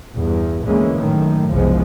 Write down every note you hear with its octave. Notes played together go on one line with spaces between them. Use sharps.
E2 G2
D2 E3 G#3 A#3 C#4
F#2 A2 D#3
F#1 C2 C#3 F3 G#3 B3